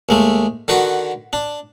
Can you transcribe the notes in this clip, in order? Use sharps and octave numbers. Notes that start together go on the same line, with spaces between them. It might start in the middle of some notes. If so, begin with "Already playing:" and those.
D#2 G#3 A3
D3 D#3 F#4 B4
D4